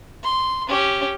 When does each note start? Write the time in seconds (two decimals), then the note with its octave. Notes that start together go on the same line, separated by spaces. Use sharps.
0.23 C6
0.69 C#4 G4